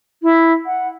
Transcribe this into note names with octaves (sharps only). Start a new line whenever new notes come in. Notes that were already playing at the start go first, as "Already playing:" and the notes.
E4
F#5